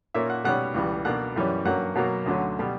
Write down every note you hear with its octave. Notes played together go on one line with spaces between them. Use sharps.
A#2 A#3 C#4 E5
F#5
B2 G3 C#4 F#5
C#2 C#3 E3 G3
B2 A#3 D4 F#5
F#2 E3 G3 C#4
G2 F#3 A#3 C#4 F#5
B2 F#3 A#3
D2 D3 F#3 C#4
B2 G3